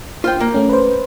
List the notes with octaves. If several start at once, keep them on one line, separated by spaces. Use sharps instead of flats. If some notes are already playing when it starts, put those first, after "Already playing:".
F4 C5 G5
A#3
A3 C#4
B4 C5